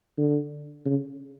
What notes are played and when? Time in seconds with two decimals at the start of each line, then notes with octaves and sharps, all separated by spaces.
0.18 D3
0.86 C#3